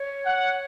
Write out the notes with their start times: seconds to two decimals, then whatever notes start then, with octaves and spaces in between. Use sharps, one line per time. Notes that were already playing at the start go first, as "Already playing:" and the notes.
Already playing: C#5
0.25 F#5